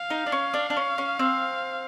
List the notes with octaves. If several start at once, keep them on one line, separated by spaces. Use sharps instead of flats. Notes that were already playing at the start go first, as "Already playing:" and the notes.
Already playing: F5
D#4
D4
C#4
D4
D4
C#4
C#4
C4